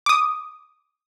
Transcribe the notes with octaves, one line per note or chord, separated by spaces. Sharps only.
D6 D#6